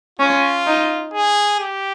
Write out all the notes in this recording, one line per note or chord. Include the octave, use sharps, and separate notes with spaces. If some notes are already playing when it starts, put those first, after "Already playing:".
C#4 F4
D#4
G#4
G4